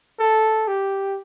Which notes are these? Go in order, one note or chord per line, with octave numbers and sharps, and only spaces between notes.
A4
G4